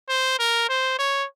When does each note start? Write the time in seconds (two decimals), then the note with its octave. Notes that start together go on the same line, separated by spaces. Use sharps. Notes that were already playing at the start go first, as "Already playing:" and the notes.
0.09 C5
0.40 A#4
0.69 C5
0.99 C#5